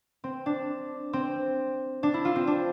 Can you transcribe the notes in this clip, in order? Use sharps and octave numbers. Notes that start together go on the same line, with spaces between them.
C4
D4
C4
D4
E4
F4
C4
D4